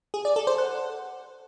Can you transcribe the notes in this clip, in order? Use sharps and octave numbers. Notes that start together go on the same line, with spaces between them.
G#4
D5
A4
C5
F#5